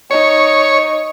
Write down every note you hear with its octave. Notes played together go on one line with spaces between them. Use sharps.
D#4 C#5